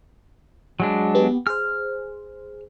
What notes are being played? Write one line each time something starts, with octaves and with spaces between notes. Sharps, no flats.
F#3 G#3 D4
B3 G4
G#4 C5 F6